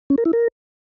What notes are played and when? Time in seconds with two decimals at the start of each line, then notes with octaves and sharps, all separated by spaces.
0.10 C#4
0.18 A#4
0.25 E4
0.33 A#4